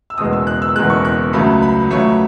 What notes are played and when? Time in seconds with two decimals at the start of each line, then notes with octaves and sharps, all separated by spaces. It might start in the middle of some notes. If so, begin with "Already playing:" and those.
0.10 E6
0.18 F#1 E2 B2 G#3 D#6
0.33 E6
0.47 F#6
0.62 E6
0.76 F#1 E2 B2 G#3 F#6
0.90 C#6
1.05 F#6
1.33 C#2 C#3 F#3 A3 B5
1.62 B5
1.91 C#2 C#3 F#3 A3 C#5